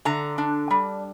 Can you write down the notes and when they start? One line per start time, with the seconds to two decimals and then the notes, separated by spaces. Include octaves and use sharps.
0.05 D3 A#5
0.38 D4
0.71 G3